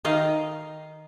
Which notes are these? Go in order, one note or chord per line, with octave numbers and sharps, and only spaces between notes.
D#3 D#5 F5